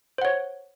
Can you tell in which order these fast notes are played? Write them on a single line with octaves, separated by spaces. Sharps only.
C5 F#5 C#5